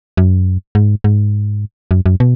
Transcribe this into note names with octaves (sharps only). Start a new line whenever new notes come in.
F#2
G#2
G#2
F#2
F#2
B2